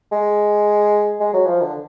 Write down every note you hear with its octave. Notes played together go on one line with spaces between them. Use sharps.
G#3
G#3
F#3
F3
D3